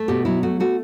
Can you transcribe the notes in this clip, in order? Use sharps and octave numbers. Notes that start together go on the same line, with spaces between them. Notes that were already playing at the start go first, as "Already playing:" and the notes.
Already playing: A3
B2 G4
F#3 E4
A3 F#4
A3 F#4